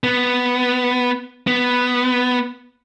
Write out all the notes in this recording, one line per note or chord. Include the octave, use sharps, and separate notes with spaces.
B3
B3